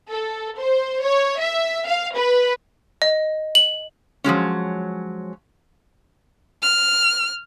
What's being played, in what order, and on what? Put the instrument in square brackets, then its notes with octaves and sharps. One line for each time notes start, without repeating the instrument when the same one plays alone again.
[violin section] A4
C5
C#5
E5
F5
B4
[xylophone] D#5
F#7
[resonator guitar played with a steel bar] F3 F#3 G#3 C#4
[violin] F6